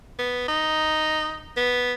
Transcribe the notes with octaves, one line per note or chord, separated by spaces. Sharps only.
B3
D#4
B3